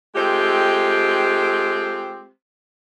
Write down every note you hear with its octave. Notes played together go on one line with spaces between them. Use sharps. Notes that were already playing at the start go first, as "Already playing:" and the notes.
G#3 A3 C4 F4 G4